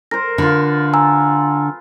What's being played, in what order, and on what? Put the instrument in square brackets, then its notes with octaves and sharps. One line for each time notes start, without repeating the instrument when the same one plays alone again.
[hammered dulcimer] A#4 C5 [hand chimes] A#6
[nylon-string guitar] D3 [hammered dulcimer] F4 B4
[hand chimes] G#5 A#5 E6